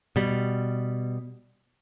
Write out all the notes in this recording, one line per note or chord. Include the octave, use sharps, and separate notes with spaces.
B2 G3